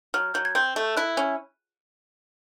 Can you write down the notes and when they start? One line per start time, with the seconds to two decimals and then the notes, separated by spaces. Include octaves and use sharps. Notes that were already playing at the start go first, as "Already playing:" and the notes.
0.14 F#3 F6
0.34 F#3 G6
0.45 G#6
0.55 C4 G6
0.76 A3
0.97 E4 F#6
1.17 C#4